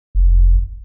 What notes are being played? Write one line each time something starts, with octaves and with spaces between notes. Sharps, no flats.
F1